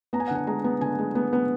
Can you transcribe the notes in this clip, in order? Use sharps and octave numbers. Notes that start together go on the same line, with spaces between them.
B3 A#5
G#5
F#5
D3 G#5
G#3 A#5
B3
D3 G#5
G#3
B3
B3